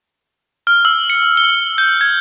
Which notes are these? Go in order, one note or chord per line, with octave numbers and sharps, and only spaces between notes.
F6
E6
C#7
G7
G6
G#6